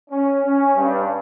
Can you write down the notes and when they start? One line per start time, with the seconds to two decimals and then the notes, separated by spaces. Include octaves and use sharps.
0.10 C#4
0.43 C#4
0.76 G2